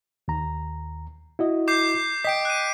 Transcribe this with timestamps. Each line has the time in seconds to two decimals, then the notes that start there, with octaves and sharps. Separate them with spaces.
0.28 D#2 A#5
1.39 E4 F#4 D#5
1.68 D6 G6 C7
2.25 D#5 G5 B6 D7
2.45 F#6 D#7